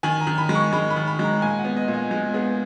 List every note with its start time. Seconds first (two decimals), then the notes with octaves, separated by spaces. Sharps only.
0.03 D#3 G#5
0.21 A#5
0.27 D#3
0.38 B5
0.49 G#3
0.55 C#6
0.72 G#3 B5
0.90 B5
0.96 D#3
1.08 B5
1.19 G#3 A#5
1.42 A#2 G#5
1.59 F#5
1.65 B3
1.76 D#5
1.88 A#2
1.93 D#5
2.11 G#3
2.34 B3 G#4